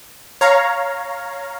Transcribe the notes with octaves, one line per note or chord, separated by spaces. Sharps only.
C#5 F5 A#5